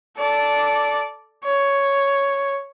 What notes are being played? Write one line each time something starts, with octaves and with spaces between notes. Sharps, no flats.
A4 D5
C#5